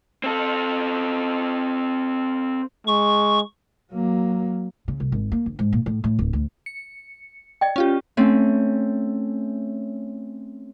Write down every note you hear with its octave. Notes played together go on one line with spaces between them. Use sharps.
C4 A4
G#3 C#6
F#3 A#3
C#3
C2
G#1
A#3
G1
G#2
A#2
A2
A2
D1
D2
C#7
D5 D#5 G5
C#4 F4 G4
A3 C4 C#4